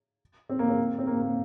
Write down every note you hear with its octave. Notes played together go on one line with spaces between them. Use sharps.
C4
A#3
C4
C4
A#3
A#3